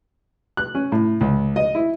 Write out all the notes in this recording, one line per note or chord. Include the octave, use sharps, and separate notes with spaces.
F#6
C#4
A2
C#2
D#5
E4